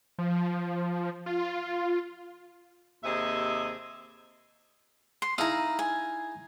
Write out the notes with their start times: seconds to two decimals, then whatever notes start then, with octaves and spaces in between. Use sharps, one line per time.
0.19 F3
1.26 F4
3.04 D#2 C3 C4 G#4 D#5 E5
5.22 C6
5.38 D#4 E4 G#4 F5 A#5
5.79 G#5